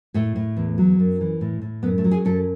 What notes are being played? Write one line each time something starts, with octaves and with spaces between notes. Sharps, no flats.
A2 A3
A2
E2
F#3
F#2
E3
A2
A2
F#2 B3
A3
F#3
G#4
F#2 A4